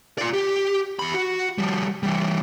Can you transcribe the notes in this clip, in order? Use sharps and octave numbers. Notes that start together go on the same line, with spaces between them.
F4 D5
G4
E2 B5
F#4
F3 G3
E3 G3